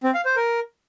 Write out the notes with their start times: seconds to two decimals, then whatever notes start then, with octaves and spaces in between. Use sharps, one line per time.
0.04 C4
0.14 F5
0.25 C5
0.36 A#4